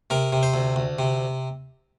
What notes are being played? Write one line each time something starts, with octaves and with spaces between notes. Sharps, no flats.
C3 A#4
C3
C5
D2
D2
C3